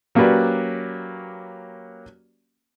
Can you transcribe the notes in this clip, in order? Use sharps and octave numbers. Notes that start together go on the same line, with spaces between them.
F#3 A#3 C#4 G4 B4 D5